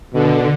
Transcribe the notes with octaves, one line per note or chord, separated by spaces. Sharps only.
B2 D3